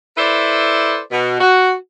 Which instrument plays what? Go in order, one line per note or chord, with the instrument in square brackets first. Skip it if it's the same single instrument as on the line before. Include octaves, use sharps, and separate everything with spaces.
[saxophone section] E4 A4 B4 C5 D5
B2
F#4